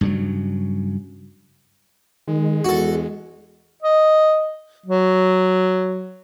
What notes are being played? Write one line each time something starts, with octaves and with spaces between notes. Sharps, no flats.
G2 C#3 F#3
D#3 G#3
E2 F#4 A4
D#5
F#3